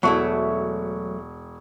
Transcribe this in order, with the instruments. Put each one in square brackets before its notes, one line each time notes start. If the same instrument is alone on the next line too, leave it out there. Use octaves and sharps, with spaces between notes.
[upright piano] E1 C#6 [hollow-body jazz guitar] F#3 A3 E4